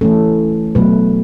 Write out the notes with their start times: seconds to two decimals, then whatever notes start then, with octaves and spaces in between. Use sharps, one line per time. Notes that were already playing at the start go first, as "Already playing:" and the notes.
0.01 E3 A3 C#4 A4
0.75 B2 F#3 A3 B4